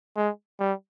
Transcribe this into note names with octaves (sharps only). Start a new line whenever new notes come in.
G#3
G3